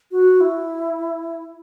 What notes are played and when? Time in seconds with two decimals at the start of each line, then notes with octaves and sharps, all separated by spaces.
0.11 F#4
0.40 E4